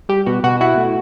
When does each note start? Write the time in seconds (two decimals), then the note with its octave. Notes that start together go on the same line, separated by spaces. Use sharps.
0.09 G3 G4
0.26 B2 F#4
0.44 B2 F#4
0.61 E4 F#4
0.77 A3